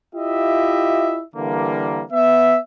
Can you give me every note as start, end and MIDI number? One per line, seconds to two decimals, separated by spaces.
0.15 1.22 64
0.15 1.22 65
0.15 1.22 67
0.15 1.22 75
0.15 1.22 76
1.36 2.03 50
1.36 2.03 52
1.36 2.03 55
1.36 2.03 58
2.12 2.58 59
2.12 2.58 76